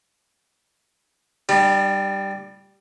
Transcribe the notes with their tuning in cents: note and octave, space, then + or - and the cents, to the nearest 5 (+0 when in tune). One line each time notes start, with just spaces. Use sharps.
G3 +0 D4 +45